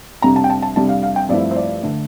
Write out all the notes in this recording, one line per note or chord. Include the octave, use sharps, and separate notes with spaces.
F2 C3 G3 D4 A#5
A5
G5
A5
A5
F2 C3 G3 D4 A5
F5
F5
G5
G2 F3 A3 C4 E4 D5
C5
D5
D3 A3